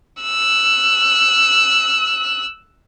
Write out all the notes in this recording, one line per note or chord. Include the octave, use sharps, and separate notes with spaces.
E6 F#6